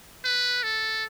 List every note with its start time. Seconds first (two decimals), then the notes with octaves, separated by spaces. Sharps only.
0.24 B4
0.63 A4